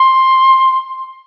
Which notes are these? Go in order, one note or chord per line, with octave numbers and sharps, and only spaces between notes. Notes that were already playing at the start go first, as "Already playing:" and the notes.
Already playing: C6